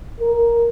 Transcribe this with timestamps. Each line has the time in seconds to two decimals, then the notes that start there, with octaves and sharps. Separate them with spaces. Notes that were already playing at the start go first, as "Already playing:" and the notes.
0.20 A#4